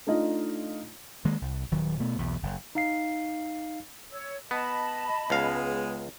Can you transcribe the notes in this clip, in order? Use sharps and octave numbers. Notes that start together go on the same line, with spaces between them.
A3 D4 D#4 F4 D#5
D#3 G#3 A#3
C2
D#1 D#3 F#3
B2 A3 B3
B1 E2
F#1
D#4 F5 C7
C#5 E6
B3 D#5 A5 B5
C#2 G#3 B3 F5